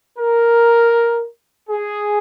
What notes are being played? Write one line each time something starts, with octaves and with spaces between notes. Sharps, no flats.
A#4
G#4